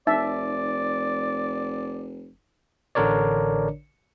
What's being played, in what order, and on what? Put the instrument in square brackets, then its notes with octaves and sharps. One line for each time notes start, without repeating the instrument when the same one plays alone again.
[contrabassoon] F1 [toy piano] D#4 [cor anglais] D5 [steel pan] E5
[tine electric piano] A1 D3 D4 A#4 C#5 D5